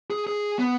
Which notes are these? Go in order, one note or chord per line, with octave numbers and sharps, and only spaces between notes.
G#4
G#4
B3